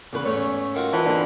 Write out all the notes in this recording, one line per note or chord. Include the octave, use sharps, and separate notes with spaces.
E2 C#3 B4
G#2 A3 C#4 C#5
D#3 F4 F#4
E3 F3
D3 B3 C4